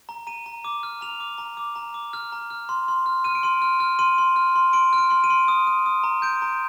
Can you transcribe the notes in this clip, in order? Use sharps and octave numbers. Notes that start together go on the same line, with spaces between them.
A#5
A#5 D#7
A#5
D6
F6
A#5 F7
D6
A#5
D6
A#5
D6
F6
A#5
F6
C6
C6
F6
F6 D#7
D7
C6 D#7
F6
F6
C6 D#7
C6
F6
C6
C6 D7
F6
D7
C6 D7
D#7
C6
D#6
D#6
D#6
A#5
G6 D7
A#5